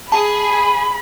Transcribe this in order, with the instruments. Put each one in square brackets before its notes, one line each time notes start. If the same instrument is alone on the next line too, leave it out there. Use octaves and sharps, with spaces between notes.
[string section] G#4 [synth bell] A5 [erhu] B5